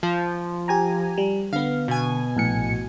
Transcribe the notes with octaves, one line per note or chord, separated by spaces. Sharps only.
F3
G4 G#5 A#5
G3
D3 B3 F5
B2 G#5
A#1 A2 C#7